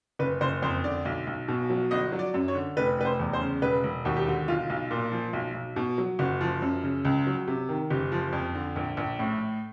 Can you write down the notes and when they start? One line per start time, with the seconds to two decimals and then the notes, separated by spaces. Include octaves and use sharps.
0.19 F#1 B4
0.41 F#1 C5
0.62 F2 C5
0.84 D3 D5
1.05 B1
1.27 B1
1.48 B2
1.70 F#3
1.91 G1 D#5
2.12 F#3
2.19 D5
2.34 F#2
2.48 C#5
2.55 D3
2.77 F1 B4
2.98 F1 B4
3.05 C5
3.19 E2
3.33 C5
3.41 C#3
3.62 E1 B4
3.84 E1
4.05 D#2 F#4
4.17 G4
4.26 D3 F#4
4.48 B1 F4
4.70 B1
4.91 A#2
5.12 F3
5.33 B1
5.55 B1
5.76 B2
5.98 F#3
6.19 F#1 F#4
6.41 F3
6.62 F#2
6.83 C#3
7.05 C#2
7.27 F#3
7.47 C3
7.69 D#3
7.90 F#1 G4
8.12 F3
8.33 F2
8.55 D3
8.76 A#1
8.97 A#1
9.19 A2